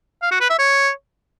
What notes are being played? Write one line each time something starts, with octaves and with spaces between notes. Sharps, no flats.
F5
F#4
B4
E5
C#5